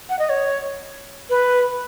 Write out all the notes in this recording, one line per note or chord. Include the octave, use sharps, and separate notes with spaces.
F#5
D#5
C#5
B4